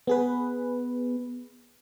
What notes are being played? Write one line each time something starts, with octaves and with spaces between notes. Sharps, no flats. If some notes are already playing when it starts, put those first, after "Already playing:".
B3 G#4 B4